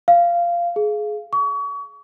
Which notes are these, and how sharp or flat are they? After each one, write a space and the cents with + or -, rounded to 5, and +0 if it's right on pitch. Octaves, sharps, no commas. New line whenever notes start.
F5 -15
G#4 +20
C#6 +35